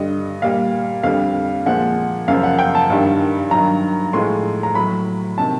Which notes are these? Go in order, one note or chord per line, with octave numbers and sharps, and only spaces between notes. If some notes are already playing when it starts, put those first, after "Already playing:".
Already playing: G2 D3 G3 D#5
A#2 G3 F5
F2 D3 G3 F5
A#2 F3 G#3 F#5
F#2 C#3 F3 F5
F#5
G5
A5
G2 D#3 G3
G2 D#3 F#3 A#5
A2 F3 G#3 C6
A#5
A2 F#3 B5
C3 D#3 A5